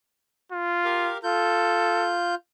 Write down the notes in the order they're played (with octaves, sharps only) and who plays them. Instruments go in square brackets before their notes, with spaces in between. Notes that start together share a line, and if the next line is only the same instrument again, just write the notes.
[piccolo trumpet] F4
[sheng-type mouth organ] G4 A#4 F5
[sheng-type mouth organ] F4 G6 [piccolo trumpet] A4